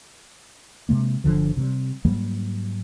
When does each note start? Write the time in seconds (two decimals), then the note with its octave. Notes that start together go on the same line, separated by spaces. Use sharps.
0.89 C3 G#3 A#3
1.24 G1 D2 D3 F3
1.57 C3 G3
2.05 G#2 F#3 G3 A#3